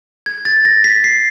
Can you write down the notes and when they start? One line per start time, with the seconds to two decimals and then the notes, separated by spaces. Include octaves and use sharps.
0.26 G#6
0.45 A6
0.65 A#6
0.84 B6
1.04 C7